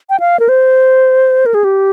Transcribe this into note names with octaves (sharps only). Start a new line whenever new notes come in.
G5
F5
A#4
C5
A#4
G#4
G4